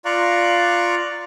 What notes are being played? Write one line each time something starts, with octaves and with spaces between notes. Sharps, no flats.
F4 D5 F5 A#5 C#6 F#6